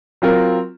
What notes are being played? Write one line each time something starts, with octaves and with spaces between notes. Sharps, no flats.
F#3 C4 F4 A#4